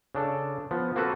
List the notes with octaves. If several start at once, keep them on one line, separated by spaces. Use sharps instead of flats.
C#3 D4 A4
F3 B3
A#3 C4 F#4 A4 B4